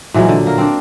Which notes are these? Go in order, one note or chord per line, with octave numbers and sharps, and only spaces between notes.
A#2 E3 F#3 G#3
D3
A#3 A#4
C4 D4